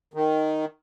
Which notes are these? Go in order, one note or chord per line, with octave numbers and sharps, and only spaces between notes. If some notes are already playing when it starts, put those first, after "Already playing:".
D#3